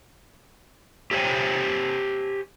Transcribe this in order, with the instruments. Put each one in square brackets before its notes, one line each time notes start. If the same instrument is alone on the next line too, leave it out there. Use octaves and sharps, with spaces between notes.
[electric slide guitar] G4 C5 C#5 G5 G#5